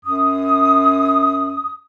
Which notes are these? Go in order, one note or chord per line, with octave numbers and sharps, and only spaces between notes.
F#2 D#6